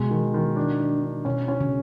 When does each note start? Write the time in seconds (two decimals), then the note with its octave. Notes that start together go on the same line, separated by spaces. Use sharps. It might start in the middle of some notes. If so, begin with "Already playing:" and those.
Already playing: B2 G#3
0.11 D#3
0.34 D#3
0.56 D4
0.80 D4
1.03 D4
1.25 B2 C#4
1.48 C#4
1.61 C#3